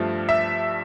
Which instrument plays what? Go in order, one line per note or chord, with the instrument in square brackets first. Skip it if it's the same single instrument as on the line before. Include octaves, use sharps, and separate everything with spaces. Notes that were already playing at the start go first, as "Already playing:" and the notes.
Already playing: [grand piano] G2 F3 A3
E5